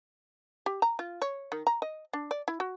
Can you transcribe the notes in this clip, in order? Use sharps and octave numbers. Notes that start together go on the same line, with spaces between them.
G4
A#5
F4
C#5
D#3
A#5
D#5
D4
D5
E4
F#4